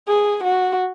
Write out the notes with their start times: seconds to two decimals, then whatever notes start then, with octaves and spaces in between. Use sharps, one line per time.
0.08 G#4
0.44 F#4